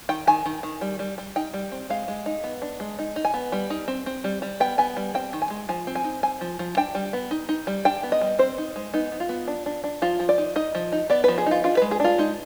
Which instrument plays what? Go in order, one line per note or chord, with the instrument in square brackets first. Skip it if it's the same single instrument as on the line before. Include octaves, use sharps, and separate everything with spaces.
[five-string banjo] D#3 G5
D#3 G#5
D#3
D#3
G3
G3
G3
D#4 G5
G3
C4
G#3 F5
G#3
D#4
B3
D4
G#3
D#4
D#4
G#5
B3
G3
D#4
C4
C4
G3
G3
B3 G5
B3 G#5
G3
C4 G5
D#3
G#5
G#3
F3 G#5
C4
G#5
D#4
C4 G#5
F3
F3
D4 G5
G3
B3
D#4
D#4
G3
D4 G5
B3
D#5
G3
C4 C5
D#4
G#3
B3 D#4
B3
F4
B3
D4
D4
D4
F3 F4
F3
D5
D#4
D#4 D#5
F3
D#4
B3 D5
F3 B4
G#4
D#4 F4
D4 F4
G#3 B4
G#4
D4 F4
G#3 D#4